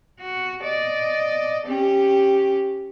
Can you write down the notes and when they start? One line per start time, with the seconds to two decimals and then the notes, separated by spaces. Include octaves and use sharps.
0.21 F#4
0.64 D5 D#5
1.67 C#4 G4